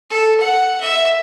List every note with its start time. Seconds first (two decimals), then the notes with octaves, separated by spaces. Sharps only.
0.10 A4
0.40 F#5
0.80 E5